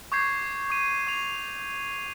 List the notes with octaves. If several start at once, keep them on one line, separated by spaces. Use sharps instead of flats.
C#6 D6 G6 G#6 C7
D6 D#7
C#6 D6 F7